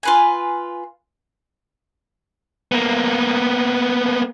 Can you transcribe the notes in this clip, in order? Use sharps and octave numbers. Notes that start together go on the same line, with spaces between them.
F4 B4 G#5
A#3 B3